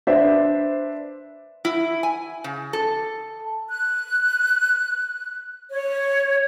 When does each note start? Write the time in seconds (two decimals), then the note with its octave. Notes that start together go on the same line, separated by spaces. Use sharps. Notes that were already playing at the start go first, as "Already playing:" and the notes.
0.07 D4 B4 C5 E5
1.65 E4
2.03 G#5
2.44 C#3
2.73 A4
3.69 F#6
5.72 C#5